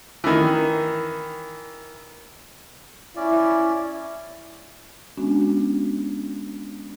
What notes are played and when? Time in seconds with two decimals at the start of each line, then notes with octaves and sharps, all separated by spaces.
0.24 D#3 E3
3.16 C#4 E4 D5
5.17 G#3 B3 C#4 D4 F#4